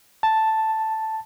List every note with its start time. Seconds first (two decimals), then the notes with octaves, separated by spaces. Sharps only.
0.23 A5